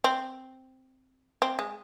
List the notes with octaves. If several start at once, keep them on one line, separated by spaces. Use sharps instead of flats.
C4
C4
G#3